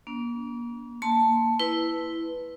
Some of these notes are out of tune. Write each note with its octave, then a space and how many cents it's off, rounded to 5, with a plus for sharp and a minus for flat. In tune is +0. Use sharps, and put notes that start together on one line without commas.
A#3 +35 D4 -40
A#3 -5 A5 +0 C6 +0
E4 +0 B4 +0